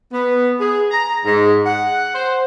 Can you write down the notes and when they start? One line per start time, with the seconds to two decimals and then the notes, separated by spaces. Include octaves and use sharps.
0.12 B3
0.60 G#4
0.91 A#5
1.25 G#2
1.65 F#5
2.15 C5